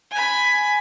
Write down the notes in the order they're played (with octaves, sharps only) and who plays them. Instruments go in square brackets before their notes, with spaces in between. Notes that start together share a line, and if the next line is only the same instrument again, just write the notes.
[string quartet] G#5 B5